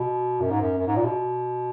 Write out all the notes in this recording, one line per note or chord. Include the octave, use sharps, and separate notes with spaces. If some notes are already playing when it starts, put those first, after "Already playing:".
Already playing: B2
F#2
G#2
F#2
F#2
G#2
A#2
B2